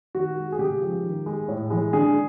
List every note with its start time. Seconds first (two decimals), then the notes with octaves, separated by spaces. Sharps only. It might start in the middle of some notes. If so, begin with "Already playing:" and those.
0.15 D#3 F#4
0.37 G#3
0.52 G#4
0.59 C#3 G4
0.82 F3 G#3
1.04 D#3
1.26 G#3
1.48 A2
1.70 E3 G#3
1.93 D3 G#4